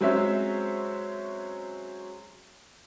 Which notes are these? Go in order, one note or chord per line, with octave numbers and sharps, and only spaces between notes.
F#3 G#3 C4 C#4 E5